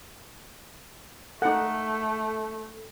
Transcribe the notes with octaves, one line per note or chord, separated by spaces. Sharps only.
A3 D#4 A4 F#5